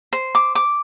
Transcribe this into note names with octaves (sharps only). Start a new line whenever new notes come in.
C5
D6
D6